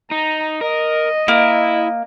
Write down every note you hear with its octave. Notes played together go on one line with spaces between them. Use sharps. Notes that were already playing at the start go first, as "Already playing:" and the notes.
D#4 A#5
A#4 D#5
A#3 E4